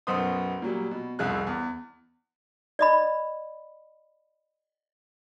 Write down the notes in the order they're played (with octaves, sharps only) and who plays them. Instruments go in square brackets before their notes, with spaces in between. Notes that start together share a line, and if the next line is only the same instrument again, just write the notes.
[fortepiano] B1 F#2 B3 C5 C6 D#6
A#2 F#3 G3
B2
C2 F2 G#4 F#6
E2
[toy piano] D5 D#5 B5